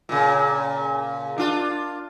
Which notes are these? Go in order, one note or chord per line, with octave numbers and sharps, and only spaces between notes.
A#2 C#3
D4 F4